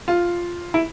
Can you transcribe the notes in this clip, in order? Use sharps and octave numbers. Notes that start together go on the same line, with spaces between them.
F4
E4